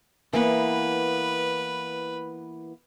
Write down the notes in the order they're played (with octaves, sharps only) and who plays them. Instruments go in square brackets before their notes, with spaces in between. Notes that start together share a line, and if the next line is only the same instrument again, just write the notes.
[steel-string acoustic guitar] E3 A#3 B3 [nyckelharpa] B4